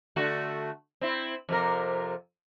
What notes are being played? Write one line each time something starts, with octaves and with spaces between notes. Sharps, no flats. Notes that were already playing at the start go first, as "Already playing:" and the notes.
D3 A3 F#4
C4 E4
F2 C3 A#4